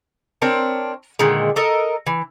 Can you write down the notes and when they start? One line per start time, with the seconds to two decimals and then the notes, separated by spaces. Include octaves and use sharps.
0.42 C4 D4 A#4 C#5
1.19 A#2 D3 D#3 G#3
1.56 A4 A#4 D#5
2.07 E3